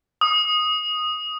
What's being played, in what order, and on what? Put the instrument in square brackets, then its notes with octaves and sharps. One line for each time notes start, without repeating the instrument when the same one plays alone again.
[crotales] D#6